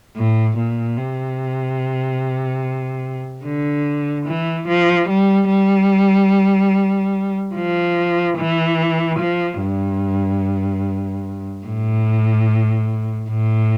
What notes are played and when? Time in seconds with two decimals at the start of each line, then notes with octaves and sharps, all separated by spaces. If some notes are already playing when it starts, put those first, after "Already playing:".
0.17 A2
0.58 A#2
0.98 C3
3.44 D3
4.26 E3
4.68 F3
5.09 G3
5.50 G3
7.55 F3
8.38 E3
9.19 F3
9.61 G2
11.65 A2
13.30 A2